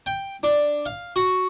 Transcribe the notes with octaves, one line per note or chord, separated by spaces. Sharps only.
G5
D4
F5
F#4